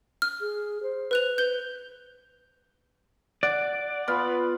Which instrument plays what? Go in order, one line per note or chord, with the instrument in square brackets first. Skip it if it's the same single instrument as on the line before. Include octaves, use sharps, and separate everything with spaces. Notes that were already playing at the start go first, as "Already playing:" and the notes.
[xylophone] F6
[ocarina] G#4
C5
[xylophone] B4 F#6 F7
[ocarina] B4 [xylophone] G6 G7
[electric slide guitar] D5 [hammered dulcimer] F#5
[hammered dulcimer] B3 F4 B5